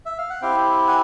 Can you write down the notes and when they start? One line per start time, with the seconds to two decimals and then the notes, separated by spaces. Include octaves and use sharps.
0.06 E5
0.18 F5
0.30 F#5
0.41 C4 E4 G4 F5 G5
0.88 F#5 G#5